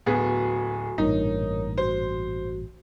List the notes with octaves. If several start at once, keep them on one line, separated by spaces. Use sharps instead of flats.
D1 B3 F#4 G#4 A4 G#5
A1 G2 A#2 D#4 A#4 C#5
F#4 C5